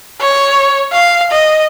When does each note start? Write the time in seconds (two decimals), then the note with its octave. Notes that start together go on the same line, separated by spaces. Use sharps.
0.21 C#5
0.93 F5
1.31 D#5